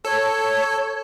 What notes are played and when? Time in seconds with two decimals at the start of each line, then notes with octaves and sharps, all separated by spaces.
0.05 A4 C#5